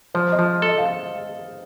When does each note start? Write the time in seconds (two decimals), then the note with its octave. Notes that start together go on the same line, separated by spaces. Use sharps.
0.14 F3 C5
0.32 D#5
0.39 F3
0.62 A4
0.68 D#5
0.78 F5